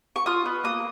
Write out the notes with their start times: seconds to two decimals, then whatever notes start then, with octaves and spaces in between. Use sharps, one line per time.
0.16 C#6
0.26 F4 D#6
0.46 B3
0.64 A#3 D#6